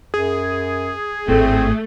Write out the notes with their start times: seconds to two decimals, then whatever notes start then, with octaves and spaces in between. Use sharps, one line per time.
0.14 F#2 G#4
1.28 G#1 A2 A3 C4